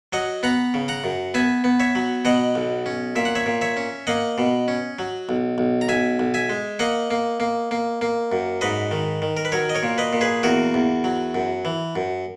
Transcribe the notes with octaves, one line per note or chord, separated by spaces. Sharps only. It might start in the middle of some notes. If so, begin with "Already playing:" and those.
F#3 D#5 F#5
B3 F#5 A#5
C#3
F#5 A#5
F#2
B3 E5 G#5
B3
C#5 E5
F#3
B2 D#5 F#5
B1
C#4
A#2 E5
F#5
C#5 E5
A#2
C#5 E5
C#4
A#3 D#5 F#5
B2
C#4
F#3
B1
B1
A#5
B1 E5 G#5
B1
E5 G#5
G#3
A#3 D#5 F#5
A#3
A#3
A#3
A#3
F#2
G#2 B4 D#5
D#3
D#3
A#4
B4
F#3 A#4 C#5
D#5
A#4 C#5
A#2
B4 D#5
A#2
G#4 B4
E2 F#4 A#4
E2
F#3
F#2
E3
F#2